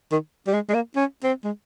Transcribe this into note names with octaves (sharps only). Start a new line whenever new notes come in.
D#3
G3
G#3
G#3
A#3
C#4
C4
G#3